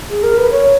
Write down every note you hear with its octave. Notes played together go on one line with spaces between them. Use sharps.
G#4
A#4
B4
C#5